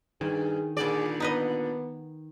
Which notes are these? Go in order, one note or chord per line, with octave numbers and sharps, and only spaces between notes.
G2 D#3 G#4
A#2 D3 G#4 D5
B3 D#4 B4 D#5